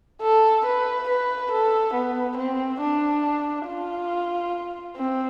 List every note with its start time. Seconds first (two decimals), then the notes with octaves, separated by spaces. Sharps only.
0.22 A4
0.65 B4
1.09 B4
1.52 A4
1.95 B3
2.38 C4
2.81 D4
3.67 F4
4.97 C4